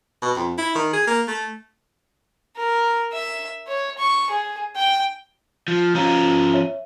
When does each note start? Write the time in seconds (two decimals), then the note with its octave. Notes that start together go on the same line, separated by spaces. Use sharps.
0.22 B2
0.36 F2
0.58 E4
0.75 D#3
0.93 G#4
1.07 A#3
1.28 A3
2.57 A#4
3.13 E5
3.67 C#5
3.98 C#6
4.30 G#4
4.76 G5
5.68 F3
5.95 F3 C#4 F5 A#5
6.53 C#5 E5